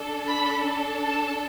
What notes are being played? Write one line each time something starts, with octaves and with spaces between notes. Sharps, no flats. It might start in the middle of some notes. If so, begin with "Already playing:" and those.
Already playing: D4 A4
B5
A5